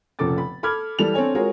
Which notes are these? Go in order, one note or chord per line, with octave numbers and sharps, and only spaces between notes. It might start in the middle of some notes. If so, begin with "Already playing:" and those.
F1 A#2 C#3 A4 D6 A6
B5
A4 B5 D6 F6 G#6
E3 G3 A4 F7
C4 D4 A4 C#5 G#5
G#3 F4 F#4 G#4 A#4 C#5